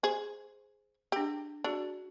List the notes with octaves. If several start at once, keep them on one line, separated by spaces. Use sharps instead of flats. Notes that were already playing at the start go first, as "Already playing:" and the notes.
G#4 C5
D4 G4 G#4
D4 F#4 G#4